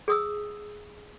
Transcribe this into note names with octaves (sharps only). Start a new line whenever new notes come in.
G#4 D#6 E6